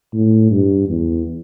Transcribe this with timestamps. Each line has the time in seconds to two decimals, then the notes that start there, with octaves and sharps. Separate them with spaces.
0.13 A2
0.51 G2
0.89 E2